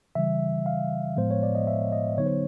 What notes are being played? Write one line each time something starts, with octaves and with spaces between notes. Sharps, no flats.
C#3 E3 G3 E5
F5
A2 F3 G#3 B3 C5
C#5
D5
D#5
E5
D#5
D3 F#3 B3 D#4 C#5
C5